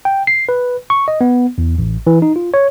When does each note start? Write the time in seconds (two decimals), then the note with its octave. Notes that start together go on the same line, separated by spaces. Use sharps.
0.05 G5
0.27 C7
0.49 B4
0.90 C#6
1.08 D#5
1.21 B3
1.58 E2
1.78 A1
2.07 E3
2.22 D#4
2.36 F4
2.54 C#5